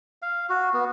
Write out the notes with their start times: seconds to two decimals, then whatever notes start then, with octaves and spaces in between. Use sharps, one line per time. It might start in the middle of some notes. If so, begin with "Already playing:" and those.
0.22 F5
0.49 F#4
0.74 B3